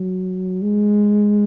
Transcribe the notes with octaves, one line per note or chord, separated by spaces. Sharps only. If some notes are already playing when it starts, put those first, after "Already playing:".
Already playing: F#3
G#3